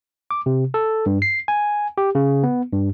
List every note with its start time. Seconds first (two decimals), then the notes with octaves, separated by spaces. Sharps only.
0.31 D6
0.46 C3
0.74 A4
1.06 G2
1.22 C7
1.48 G#5
1.98 G4
2.15 C#3
2.43 B3
2.73 G2